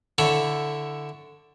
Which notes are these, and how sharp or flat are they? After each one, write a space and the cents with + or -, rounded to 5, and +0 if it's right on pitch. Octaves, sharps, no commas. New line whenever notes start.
D3 +0 E4 +0 C#5 +0